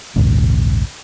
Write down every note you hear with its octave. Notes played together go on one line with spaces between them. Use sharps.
A#1 D#2 G#2 C#3